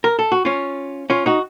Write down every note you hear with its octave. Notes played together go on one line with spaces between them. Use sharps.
A#4
A4
F#4
C#4 F4
C#4 F4
D#4 F#4